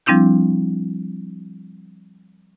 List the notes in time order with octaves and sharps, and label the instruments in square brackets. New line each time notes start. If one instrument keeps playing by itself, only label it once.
[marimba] F3 G3 C4 D4 E4 G6